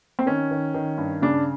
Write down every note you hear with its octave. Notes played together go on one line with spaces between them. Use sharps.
C4
D#3 C#4
D#3
D#3
G2
C#3 D4